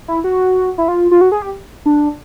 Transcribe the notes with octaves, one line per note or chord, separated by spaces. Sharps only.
E4
F#4
E4
F4
F4
F#4
G#4
G4
D4